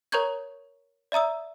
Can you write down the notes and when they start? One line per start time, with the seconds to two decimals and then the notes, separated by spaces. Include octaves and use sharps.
0.12 A#4 C#5 A#5 C#6 G6 G#6
1.12 D5 E5 A#5 D#6 E6